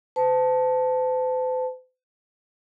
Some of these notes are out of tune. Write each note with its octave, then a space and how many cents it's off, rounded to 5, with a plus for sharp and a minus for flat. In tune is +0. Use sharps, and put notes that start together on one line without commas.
C5 -45 A5 +0